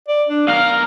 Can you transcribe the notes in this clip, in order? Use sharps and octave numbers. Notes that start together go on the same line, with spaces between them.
D5
D4
B1 A#4 F5